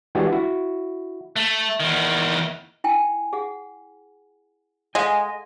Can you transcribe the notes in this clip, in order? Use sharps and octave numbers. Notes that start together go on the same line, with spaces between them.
E3 G#3 D4 F#4 G4
E4 F#4
A3
E2 D#3
E4 G5 G#5
G#4 F#5
G#3 A4 D#5 F5 F#5 G#5